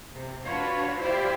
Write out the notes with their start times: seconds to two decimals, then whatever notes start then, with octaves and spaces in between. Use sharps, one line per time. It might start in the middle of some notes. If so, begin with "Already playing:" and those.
0.15 C3
0.45 D4 F4 F#4 B4 C#5
0.99 E4 F4 G4 C5 D5